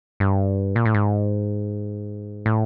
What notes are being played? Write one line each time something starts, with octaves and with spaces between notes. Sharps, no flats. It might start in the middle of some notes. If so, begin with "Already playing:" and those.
G2
A#2
A2
G#2
A2